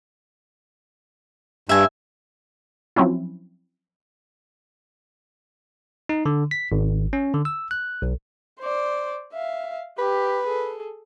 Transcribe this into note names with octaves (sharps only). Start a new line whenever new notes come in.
G2 E5 G#5
F3 F#3 C4 C#4 E4
D#4
D3
B6
G#1
C#4
D3
E6
F#6
B1
C5 D5
E5 F5
G4 B4
G#4 A4